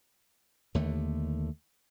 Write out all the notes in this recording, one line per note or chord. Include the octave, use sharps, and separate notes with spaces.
D#2 D3 A3